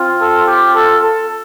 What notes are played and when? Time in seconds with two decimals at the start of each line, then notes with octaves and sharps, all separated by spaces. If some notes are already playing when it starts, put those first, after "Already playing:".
Already playing: C4 F4
0.19 A4
0.46 G4
0.75 A4
1.03 A4